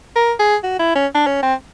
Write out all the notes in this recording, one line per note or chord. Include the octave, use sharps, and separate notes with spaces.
A#4
G#4
F#4
E4
C#4
D4
C#4
C4